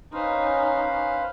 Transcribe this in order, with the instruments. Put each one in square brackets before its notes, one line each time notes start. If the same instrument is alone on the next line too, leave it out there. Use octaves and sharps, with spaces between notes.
[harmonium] C#4 [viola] D#4 [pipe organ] B4 C5 F5